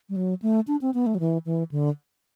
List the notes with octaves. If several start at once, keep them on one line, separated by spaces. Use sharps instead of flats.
G3
F#3
A3
D4
C4
B3
A3
F#3
E3
E3
D3